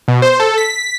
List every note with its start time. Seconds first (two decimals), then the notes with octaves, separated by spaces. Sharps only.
0.08 B2
0.22 C5
0.40 A4
0.58 B6